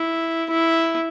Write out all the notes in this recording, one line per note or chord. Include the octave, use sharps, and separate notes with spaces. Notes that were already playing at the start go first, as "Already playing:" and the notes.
Already playing: E4
E4